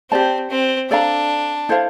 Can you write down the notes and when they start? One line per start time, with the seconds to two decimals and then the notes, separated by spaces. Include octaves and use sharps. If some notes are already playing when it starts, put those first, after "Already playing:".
0.11 C4 G4 D5 A5
0.50 C4
0.90 D4 A4 D5 F5 A#5
1.69 E4 A4 C5 F5